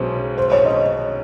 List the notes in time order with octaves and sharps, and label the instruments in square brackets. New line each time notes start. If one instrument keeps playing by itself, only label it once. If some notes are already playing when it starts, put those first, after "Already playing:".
Already playing: [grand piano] B1 B2 G#3 C#4 [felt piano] C5
[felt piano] C5
C#5
D#5